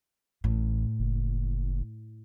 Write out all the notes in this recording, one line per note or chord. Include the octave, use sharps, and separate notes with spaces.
A1 A2
F#1